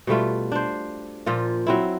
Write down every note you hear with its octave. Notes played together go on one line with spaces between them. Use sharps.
B2 G3 A3 F4
D4 C5
A#2 F3 F4
F#3 C4 E4